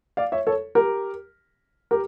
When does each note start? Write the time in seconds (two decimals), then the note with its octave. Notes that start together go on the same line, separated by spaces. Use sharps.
0.17 D5 F5
0.32 C#5 E5
0.47 A4 C#5
0.75 G4 A#4
1.91 G4 A#4